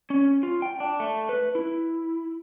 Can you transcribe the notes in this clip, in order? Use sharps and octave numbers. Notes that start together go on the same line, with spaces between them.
C#4
F4
G5
D4
A3
B4
E4